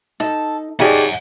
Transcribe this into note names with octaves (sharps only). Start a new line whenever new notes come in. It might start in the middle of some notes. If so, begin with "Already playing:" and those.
D#4 A4
C#3 D#4 G4 D5 F#5 G#5 A5